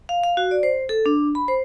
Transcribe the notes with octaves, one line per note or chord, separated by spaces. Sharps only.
F5
F5
F#4
D5
C5
A4
D4
B5
C5